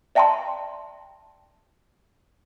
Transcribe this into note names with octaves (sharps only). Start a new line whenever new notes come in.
D5 E5 G5 A5 A#5 C6